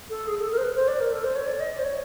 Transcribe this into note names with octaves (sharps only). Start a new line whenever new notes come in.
A4
G#4
A4
A#4
C5
B4
C5
D5
A#4
A4
C5
C#5
D5
D#5
D5
C5
C#5